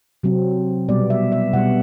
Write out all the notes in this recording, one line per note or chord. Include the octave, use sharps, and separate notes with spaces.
C3 F#3 C4
B2 G3 B3 D5
E5
E5
B2 G3 B3 F#5